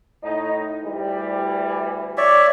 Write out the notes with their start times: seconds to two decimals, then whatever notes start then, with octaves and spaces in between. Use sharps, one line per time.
0.24 A2 D#4
0.84 D2 E3 G3
2.18 C#5 D5 E5